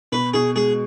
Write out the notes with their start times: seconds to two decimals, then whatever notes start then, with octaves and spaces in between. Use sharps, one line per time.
0.12 B2 B4
0.34 B2 G#4
0.56 G#3 G#4